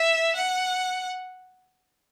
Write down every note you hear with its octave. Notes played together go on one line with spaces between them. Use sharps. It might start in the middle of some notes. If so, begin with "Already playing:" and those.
Already playing: E5
F#5